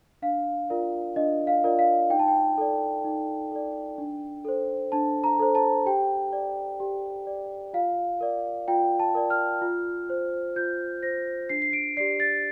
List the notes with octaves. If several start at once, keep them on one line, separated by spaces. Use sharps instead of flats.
D4 F5
F4 A#4 D5
D4 D#5
F5
F4 A#4 D5
F5
D#4 G5
A5
G5
A4 D5
D#4
A4 D5
D4
A4 C5
D4 A5
A#5
A4 C5
A5
G4 G5
D5
G4
D5
F4 F5
A#4 D5
F4 G5
A5
A#4 D5
F6
F4
C5
F4 G6
C5 A#6
D4 C7
C7
D7
G4 D5 C7
A6